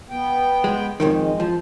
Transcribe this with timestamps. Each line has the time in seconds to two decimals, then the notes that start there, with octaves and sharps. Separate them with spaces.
0.10 B3 G5
0.64 G#3
1.00 F2 G#2 D#3
1.13 G#3
1.40 F3